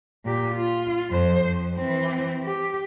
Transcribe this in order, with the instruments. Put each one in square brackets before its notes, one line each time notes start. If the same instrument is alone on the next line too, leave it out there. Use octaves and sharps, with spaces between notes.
[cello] A#2 G4
F4
F2 C5
F2
E3 C4
G4